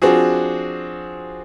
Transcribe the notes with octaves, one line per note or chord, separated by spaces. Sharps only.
F3 C4 D4 F#4 G#4